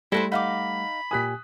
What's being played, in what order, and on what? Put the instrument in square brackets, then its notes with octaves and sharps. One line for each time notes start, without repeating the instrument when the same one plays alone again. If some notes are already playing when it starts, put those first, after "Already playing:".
[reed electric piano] G3 A3 [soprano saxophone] E4 [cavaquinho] A4 B4 C5 [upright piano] A#6
[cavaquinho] D#4 F5 D6 [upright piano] F#5 [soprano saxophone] B5
[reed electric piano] A#2 G4 G#5 [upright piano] D#6 F#6 B6